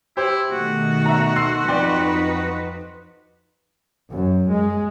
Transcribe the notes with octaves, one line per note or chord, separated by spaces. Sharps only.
E4 G4 C5
B2 D#3 A3 F#4
E5 A#5
C6 E6 C7
F2 D#4 B4 D5 G5 C6
F#2
G#3